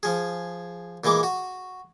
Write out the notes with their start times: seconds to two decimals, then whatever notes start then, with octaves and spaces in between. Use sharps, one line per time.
0.03 F3 G#4
1.04 A#2 E3 G#3 D6
1.23 F#4